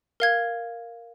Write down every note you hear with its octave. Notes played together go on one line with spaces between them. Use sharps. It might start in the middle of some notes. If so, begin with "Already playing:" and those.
A#4 F5 G#6